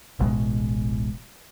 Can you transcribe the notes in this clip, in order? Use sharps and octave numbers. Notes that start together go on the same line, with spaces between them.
D1 A1 B2 G#3